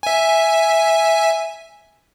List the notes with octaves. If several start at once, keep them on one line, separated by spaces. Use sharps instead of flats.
E5 G#5